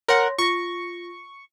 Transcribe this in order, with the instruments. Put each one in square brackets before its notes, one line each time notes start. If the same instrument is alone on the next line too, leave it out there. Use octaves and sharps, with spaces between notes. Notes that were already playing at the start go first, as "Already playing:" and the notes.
[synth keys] A#4 F#5 [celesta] C#5 C6 A#6
[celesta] F4 A#6 [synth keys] C#6